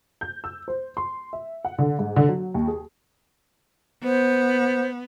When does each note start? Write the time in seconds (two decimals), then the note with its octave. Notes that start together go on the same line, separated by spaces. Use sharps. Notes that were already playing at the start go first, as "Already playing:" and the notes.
0.21 G6
0.44 E6
0.68 C5
0.97 C6
1.33 E5
1.65 F#5
1.79 D3
1.99 G#2
2.16 D3
2.29 F#3
2.54 D#2
2.68 G#4
4.03 B3 C5